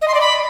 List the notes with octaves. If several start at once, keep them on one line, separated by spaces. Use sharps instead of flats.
D#5
C6
D5
B5